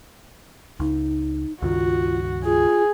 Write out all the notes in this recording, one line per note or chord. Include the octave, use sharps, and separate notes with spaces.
C#2 D#4
C#2 G2 D#3 F4 F#4
F4 G#4